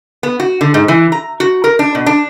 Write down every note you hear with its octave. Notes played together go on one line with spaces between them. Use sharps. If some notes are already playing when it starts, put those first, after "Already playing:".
B3
F#4
D3
G#2
E3
A#5
F#4
A#4
D4
B2
D4